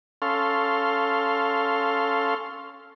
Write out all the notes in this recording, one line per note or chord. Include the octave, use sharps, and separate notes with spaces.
C#4 A4 F5 C6